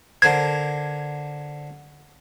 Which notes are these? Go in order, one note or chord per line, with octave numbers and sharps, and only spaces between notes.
D3 A#4 C5 G#6